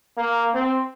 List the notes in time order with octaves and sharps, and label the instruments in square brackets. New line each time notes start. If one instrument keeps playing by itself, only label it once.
[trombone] A#3
C4